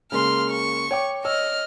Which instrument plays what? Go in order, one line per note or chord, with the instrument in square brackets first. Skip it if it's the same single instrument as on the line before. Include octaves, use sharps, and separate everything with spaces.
[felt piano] C#3 G#3 A#3 [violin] C6 F6
[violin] C#6
[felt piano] C#5 G5 D6
[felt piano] C#5 E6 [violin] D#5 F6